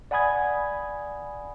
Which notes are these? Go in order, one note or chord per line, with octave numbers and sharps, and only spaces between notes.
D5 F#5 G#5 B5 D#6 G#6